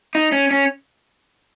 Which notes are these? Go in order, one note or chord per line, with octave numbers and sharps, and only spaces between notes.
D#4
C#4
C#4